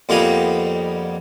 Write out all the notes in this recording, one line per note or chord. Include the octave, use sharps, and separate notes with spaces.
F2 G3 A#3 B3 D#4 G#4